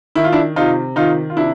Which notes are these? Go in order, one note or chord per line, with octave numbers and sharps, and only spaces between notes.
D#3 E4
F4
D4 E4
C3 D#4 F4
D#3 D#4 F4
F4
C3 D4 E4